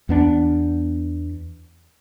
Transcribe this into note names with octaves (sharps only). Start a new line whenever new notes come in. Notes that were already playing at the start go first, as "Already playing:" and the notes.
E2 B3 D4